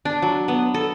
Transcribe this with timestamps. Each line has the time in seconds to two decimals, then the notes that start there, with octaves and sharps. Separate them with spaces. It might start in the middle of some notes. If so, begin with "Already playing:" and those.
0.05 D4
0.22 F#3
0.48 B3
0.74 A4